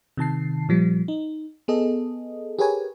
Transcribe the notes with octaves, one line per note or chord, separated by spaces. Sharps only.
C3 D#3 A5 C7
A#2 F3 G3
D#4
B3 G#4 A4 D#5
G4 G#4 A#4 B4 C#5 G#5